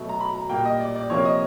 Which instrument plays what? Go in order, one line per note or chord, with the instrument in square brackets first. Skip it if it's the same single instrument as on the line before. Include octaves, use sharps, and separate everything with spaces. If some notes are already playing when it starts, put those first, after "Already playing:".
Already playing: [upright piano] B2 F#3 A3
A#5
B5
A#5
A#2 G3 A#3 G5
D#5
D5
D5
C3 F3 A#3 C#5
D#5